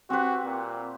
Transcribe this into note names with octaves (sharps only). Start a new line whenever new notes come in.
C4 F#4 G4 B4
A#2